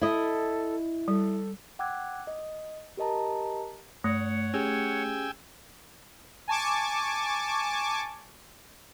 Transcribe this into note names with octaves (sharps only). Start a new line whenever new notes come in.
E4 A4 D#5
G3 A4
F#5 G5 D6 E6 F#6 G#6
D#5
G4 A#4 D#5 A5 A#5
G2 A3 C#5 F#5
C#4 G4 G#4 G5 G#5 E6
G#5 A5 C#6 D6